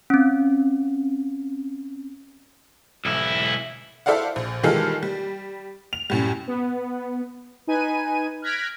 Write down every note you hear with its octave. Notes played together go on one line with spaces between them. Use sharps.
C4 C#4
B1 E4
E4 A4 C5 D5 F5 F#5
A#1
D#3 E3 G3 G#3 F4 A4
G3
F7
F#2 A2 G3
B3
D#4 B4 G#5 D#7
F6 F#6 G#6 A#6 B6 D7